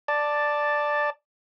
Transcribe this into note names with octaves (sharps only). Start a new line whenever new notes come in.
D5 A5